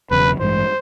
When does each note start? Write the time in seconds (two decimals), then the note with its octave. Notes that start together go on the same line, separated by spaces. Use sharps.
0.11 E1 E2 C#3 F#3 B4
0.39 A1 G2 E3 G#3 C5